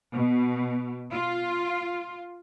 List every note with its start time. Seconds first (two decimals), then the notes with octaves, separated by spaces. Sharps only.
0.14 B2
1.11 F4